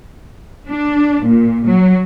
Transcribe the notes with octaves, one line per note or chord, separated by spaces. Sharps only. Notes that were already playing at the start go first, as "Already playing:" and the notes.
D4
A#2
F#3